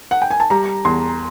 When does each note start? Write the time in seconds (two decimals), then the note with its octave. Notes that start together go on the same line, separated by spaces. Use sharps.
0.11 F#5
0.22 G5
0.31 G#5
0.40 A5
0.50 G3 A#5
0.85 E2 C6